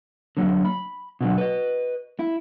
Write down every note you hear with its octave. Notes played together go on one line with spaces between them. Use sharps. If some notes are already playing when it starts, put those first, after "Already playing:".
D3 F#3 A#3
B5
B2 D3 F#3
B4 D#5
E4